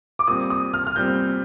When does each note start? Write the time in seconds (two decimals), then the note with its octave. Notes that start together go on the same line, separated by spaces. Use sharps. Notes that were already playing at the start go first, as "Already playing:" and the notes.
0.19 D6
0.27 A#2 G3 C4 D#6
0.50 D#6
0.74 F6
0.87 F6
0.96 A#2 G3 C4 G6